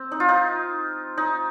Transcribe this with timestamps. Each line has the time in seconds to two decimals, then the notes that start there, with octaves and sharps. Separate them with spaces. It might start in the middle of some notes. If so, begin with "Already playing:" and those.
Already playing: C4
0.12 D#4
0.20 F4
0.29 D#4
1.17 D#4